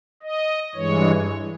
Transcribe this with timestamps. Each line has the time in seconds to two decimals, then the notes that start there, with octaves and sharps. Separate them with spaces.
0.23 D#5
0.75 G2 E3 G#3 C#5